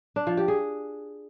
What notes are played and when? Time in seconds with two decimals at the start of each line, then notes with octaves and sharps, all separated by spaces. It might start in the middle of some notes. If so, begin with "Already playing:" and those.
0.16 D4
0.27 F3
0.37 G4
0.48 G#4